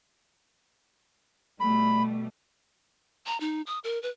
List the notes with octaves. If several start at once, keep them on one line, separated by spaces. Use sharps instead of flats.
B2 G3 A3 B5
A#5
D#4
D#6
A#4
B4